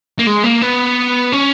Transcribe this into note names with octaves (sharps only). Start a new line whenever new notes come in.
A#3
G#3
A#3
B3
C#4